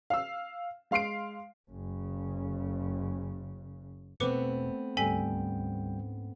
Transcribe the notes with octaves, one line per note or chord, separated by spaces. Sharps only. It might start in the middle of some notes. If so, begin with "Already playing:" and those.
F5 E6
G#3 F5 C6 C7 D7
F#1 C#3
E1 B2 A3 B3 C4 B4 D6 C#7
D2 G#2 G3 C#4 A4 G5 G#5 B6